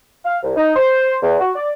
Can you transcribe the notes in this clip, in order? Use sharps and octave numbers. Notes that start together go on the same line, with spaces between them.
F5
C2
D#4
C5
E2
F#4
D5